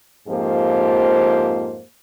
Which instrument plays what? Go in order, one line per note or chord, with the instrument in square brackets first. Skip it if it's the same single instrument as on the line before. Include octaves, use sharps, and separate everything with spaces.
[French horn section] F2 G#2 F3 A#3 G4 C5